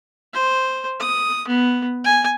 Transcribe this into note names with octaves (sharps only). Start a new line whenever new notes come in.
C5
D#6
B3
G#5